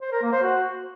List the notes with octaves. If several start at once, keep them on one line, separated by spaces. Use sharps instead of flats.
C5
A#4
A#3
C5
F#4